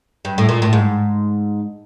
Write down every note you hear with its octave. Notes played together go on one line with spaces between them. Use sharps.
G2
A2
A#2
A2
G#2